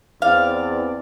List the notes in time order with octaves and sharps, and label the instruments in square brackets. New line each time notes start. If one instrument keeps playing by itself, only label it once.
[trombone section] E2 [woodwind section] C4 D5 [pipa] F5